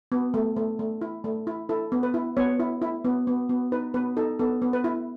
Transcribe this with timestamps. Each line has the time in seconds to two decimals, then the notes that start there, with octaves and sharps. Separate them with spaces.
0.12 B3
0.34 A3
0.56 A3
0.79 A3
1.01 E4
1.24 A3
1.47 E4
1.69 E4 A4
1.92 B3
2.03 B4
2.14 E4
2.37 B3 C#5
2.59 E4
2.82 E4
3.05 B3
3.27 B3
3.49 B3
3.72 D#4 B4
3.94 B3 B4
4.17 D#4 A4
4.39 B3 A4
4.62 B3
4.73 B4
4.84 E4